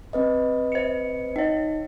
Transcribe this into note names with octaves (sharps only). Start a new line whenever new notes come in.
C4 B4 D#5
C5 C#7
D#4 C#5 D#5